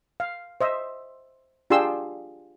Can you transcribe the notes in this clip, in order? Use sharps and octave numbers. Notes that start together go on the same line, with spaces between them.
F5
C5 D#5 E5
D4 F4 G4 G#4 C6 E6